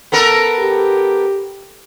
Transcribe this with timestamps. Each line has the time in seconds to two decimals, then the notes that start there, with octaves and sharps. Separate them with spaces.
0.12 B3 A4 A#4
0.59 G4